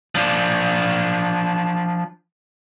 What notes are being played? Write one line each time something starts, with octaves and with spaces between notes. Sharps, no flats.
F3 D4